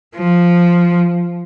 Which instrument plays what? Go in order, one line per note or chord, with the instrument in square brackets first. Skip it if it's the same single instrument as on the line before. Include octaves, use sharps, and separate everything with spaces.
[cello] F3